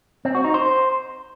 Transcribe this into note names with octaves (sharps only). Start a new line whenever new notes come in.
C4
F#4
D#4
C5